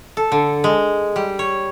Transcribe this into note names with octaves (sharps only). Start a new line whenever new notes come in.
A4
D3
G#3
G3
C#5